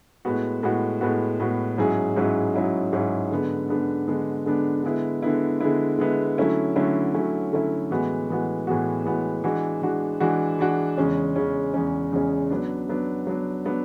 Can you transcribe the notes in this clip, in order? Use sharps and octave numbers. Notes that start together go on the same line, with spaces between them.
A2 G#3 B3 F#4
A2 G#3 B3 F#4
A2 G#3 B3 F#4
A2 G#3 B3 F#4
G#2 F#3 C#4 E4 G#4
G#2 F#3 C#4 E4 G#4
G#2 F#3 C#4 E4 G#4
G#2 F#3 C#4 E4 G#4
D3 G#3 B3 D4
D3 G#3 B3 D4
D3 G#3 B3 D4
D3 G#3 B3 D4
D3 G#3 B3 E4
D3 G#3 B3 E4
D3 G#3 B3 E4
D3 G#3 B3 E4
D3 F#3 A3 C#4 E4
D3 F#3 A3 C#4 E4
D3 F#3 A3 C#4 E4
D3 F#3 A3 C#4 E4
A2 E3 G#3 B3 F#4
A2 E3 G#3 B3 F#4
A2 E3 G#3 B3 F#4
A2 E3 G#3 B3 F#4
E3 G#3 D4 F#4
E3 G#3 D4 F#4
E3 G#3 D4 F#4
E3 G#3 D4 F#4
E2 C#3 G#3 C#4
E2 C#3 G#3 C#4
E2 C#3 G#3 C#4
E2 C#3 G#3 C#4
F#3 B3 D4
F#3 B3 D4
F#3 B3 D4
F#3 B3 D4